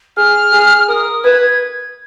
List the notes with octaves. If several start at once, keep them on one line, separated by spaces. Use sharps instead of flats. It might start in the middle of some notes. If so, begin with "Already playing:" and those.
G#4 F6
G#4
F6
A#4 D#6
B4 G#6
G#6